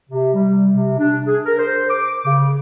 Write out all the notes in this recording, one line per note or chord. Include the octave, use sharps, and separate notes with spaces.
C3
G3
C3
D4
G#4
A#4
C5
D6
C#3